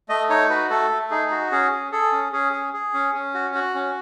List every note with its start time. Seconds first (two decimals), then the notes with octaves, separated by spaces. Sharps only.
0.09 A3 D#5
0.30 D#4 C#5
0.49 F#4 B4
0.70 A3 A4
0.90 A3
1.11 D#4 G#4
1.31 F#4
1.51 C#4 G#4
1.71 G#4
1.92 G#4 A4
2.12 C#4
2.32 C#4 G#4
2.53 G#4
2.73 G#4
2.94 C#4
3.14 C#4
3.34 F#4
3.54 F#4
3.75 C#4